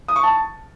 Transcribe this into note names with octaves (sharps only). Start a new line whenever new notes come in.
D#6
C#6
A5